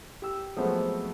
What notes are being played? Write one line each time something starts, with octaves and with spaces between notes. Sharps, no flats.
G4 E6
F3 F#3 G#3 A3 B3 C4